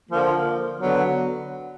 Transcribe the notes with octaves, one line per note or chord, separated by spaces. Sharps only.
D3 F3 A#3
D3 F#3 B3